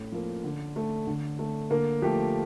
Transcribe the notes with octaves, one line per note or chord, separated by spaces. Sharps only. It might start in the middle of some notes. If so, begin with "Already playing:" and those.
Already playing: A2 C#4 C#5
F3 A#3
D3
A3
D3
A3
D3 A#3 A#4
F3 A3 G4